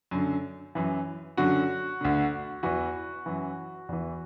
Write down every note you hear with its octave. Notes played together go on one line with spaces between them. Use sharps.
F#2 D3
F#2 E3
F#2 D3 F#4
D2 D3
E2 E3 F#4
F#2 E3
E2 E3